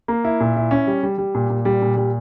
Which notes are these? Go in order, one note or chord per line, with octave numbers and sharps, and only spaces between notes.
A#3
E4
A#2
E4
C#4
G3
G3
G3
A#2
A#2
G3
A#2
G3